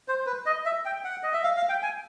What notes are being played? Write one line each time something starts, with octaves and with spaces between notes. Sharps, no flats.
C5
B4
D#5
E5
G5
F#5
D#5
E5
F5
F5
G5
G#5